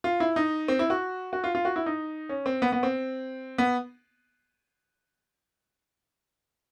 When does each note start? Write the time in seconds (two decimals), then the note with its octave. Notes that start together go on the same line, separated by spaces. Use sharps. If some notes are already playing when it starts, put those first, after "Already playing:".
0.04 F4
0.20 E4
0.36 D#4
0.68 C4
0.79 E4
0.90 F#4
1.33 F#4
1.44 F4
1.55 F4
1.65 F#4
1.76 E4
1.86 D#4
2.29 C#4
2.46 C4
2.62 B3
2.72 B3
2.83 C4
3.58 B3